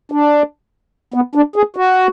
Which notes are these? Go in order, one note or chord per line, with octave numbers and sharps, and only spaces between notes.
D4
B3
D4
G#4
F#4